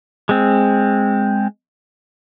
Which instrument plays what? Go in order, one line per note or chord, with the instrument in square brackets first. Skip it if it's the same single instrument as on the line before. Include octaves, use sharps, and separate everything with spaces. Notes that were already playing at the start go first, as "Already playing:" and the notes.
[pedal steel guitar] G#3 C4